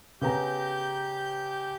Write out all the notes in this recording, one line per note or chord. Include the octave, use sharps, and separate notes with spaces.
C#3 B3 G4 A#5 G6